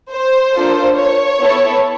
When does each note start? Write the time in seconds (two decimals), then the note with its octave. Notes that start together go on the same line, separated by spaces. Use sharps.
0.10 C5
0.54 A#3 D4 F4 A4
0.96 C#5
1.40 B3 E4 A4